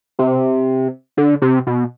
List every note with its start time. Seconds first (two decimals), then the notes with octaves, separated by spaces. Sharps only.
0.19 C3
1.17 D3
1.42 C3
1.67 B2